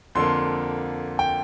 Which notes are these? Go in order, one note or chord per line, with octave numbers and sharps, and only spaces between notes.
F2 D3 A#3 C6
G5